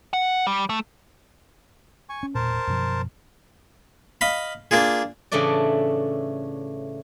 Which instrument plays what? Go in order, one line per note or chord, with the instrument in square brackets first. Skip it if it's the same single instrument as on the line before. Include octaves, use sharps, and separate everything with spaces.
[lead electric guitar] F#5
G3
A3
[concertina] G#5 C#6
[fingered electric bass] C#4
[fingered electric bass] E1 A#2 [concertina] A#4 C5 A5
[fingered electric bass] F#2 B2 F3
[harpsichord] D#5 F5 B5
A#3 D4 F4 G#4
[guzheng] A2 C#3 E3 A3 D4 D5